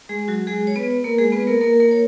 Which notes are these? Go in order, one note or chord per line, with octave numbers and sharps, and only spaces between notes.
G#3 G#4
F#3 F#4
G#3 G#4
C#5
B3 B4
A#3 A#4
G#3 G#4
B3 B4
A#3 A#4
A#3 A#4
A#3 A#4
C#5